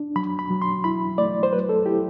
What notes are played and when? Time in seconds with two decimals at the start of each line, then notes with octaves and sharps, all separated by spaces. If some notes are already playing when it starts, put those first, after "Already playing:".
Already playing: D4
0.16 F#3 B5
0.39 B5
0.50 F#3
0.62 C6
0.84 E4 B5
1.18 A3 D5
1.43 C5
1.52 F#3 B4
1.69 A4
1.86 E4 G4